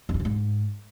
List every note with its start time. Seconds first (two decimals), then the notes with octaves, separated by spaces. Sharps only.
0.09 F2
0.14 D3
0.20 C#3
0.25 G#2